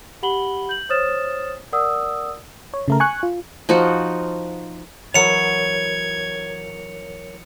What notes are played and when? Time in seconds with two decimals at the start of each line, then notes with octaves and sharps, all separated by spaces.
0.23 G4 F#5 B5 F#7 G7
0.69 G6 F#7
0.89 C5 C#5 D#6 F6 A6 E7
1.72 A#4 D5 F#5 D#6 E6
2.74 C#5
2.88 C#3 A3 A#4
3.00 G#5 C#6 F#6
3.23 F4
3.69 F3 D#4 F#4
5.14 E3 F#3 A#4 C#5 G#6 C#7 F7